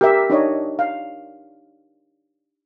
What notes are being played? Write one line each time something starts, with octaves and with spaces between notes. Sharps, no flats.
G4 A#4 E5
D4 D#4 C#5 D#5
F5